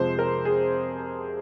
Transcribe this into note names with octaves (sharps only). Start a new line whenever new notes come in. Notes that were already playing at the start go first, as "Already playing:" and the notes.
Already playing: F2 C3 F3 G#3 C5
A#4
G#4